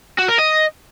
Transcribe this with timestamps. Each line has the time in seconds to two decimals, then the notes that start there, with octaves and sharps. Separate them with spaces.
0.18 F#4
0.28 A#4
0.38 D#5